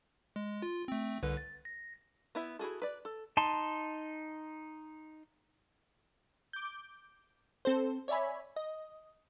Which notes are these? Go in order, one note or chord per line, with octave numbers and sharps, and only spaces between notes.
G#3
F4
A3 C4
C2 D3 B4
A6
A#6
B3 E4 E5
E4 F#4 G#4 A4
B4 D5
A4
D#4 A5 C6
D6 G6
C4 A4 C5
C#5 D5 E5 G#5 B5
D#5